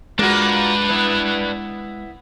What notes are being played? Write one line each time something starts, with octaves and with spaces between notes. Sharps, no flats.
G#3 A#3 D4 F4 F#4 B4
B3 E4